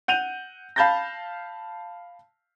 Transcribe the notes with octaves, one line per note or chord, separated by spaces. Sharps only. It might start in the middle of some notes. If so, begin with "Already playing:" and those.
F#5 G6 D#7 F7
F5 A5 B5 G6 A6 A#6